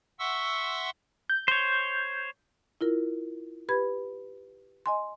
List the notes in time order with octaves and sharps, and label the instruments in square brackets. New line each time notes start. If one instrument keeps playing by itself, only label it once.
[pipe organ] E5 F#5 C6 C#6 E6
[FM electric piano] G6
[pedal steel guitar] C5 C#5 [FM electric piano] G6
[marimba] E4 F4 A#4
G4 B4 B5 G#6
D#5 G#5 C6